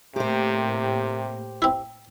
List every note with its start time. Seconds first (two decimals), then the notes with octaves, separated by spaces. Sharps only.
0.16 A2 C3 A#3 G4 C5
1.62 C4 E4